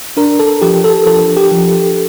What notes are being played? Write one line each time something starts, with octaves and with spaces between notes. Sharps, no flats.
D4 A#4
A4
F3 G4
A4
F3 A4
G4
F3